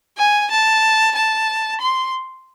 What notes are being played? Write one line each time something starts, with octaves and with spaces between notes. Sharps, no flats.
G#5
A5
A5
C6